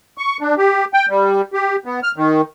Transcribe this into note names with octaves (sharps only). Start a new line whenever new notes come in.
C#6
D4
G4
G5
G3
G4
B3
F6
D#3